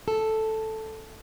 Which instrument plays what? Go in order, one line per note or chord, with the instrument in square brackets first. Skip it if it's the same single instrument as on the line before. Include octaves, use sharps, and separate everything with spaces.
[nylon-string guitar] A4